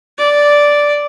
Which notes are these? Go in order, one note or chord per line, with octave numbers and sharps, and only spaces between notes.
D5